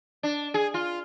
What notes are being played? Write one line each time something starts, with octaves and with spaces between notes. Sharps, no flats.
D4
G#4
F4